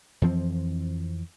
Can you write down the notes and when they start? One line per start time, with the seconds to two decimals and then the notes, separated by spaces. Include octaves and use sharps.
0.22 F2 E3 F3 C4